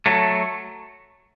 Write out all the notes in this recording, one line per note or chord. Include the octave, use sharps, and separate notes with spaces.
F#3 A3